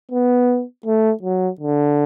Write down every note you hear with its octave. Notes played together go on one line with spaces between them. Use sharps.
B3
A3
F#3
D3